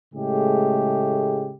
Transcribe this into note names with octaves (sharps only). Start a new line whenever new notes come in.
A2 C#3 G#3 A3 G4